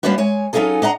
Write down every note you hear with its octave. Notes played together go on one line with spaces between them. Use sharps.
G3 A#3 B3 C#4 D4 F#4
G#3 C#5 G#5
F#3 C#4 D#4 F4 G#4 A4
D4 D#5 F#5 A#5